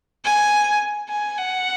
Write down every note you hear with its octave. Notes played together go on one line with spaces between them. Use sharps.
G#5
G#5
F#5